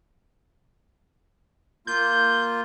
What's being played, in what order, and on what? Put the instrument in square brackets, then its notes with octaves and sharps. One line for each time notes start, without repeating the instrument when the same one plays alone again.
[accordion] A#3 F4 [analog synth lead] G6